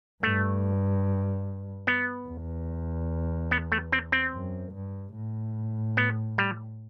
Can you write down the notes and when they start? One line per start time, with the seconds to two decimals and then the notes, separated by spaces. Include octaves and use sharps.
0.23 G2 A3
1.87 B3
2.28 E2
3.51 B3
3.72 A3
3.92 C4
4.12 C4
4.33 F#2
4.74 G2
5.15 A2
5.97 B3
6.38 G3